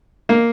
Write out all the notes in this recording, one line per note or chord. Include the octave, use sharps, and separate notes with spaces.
A#3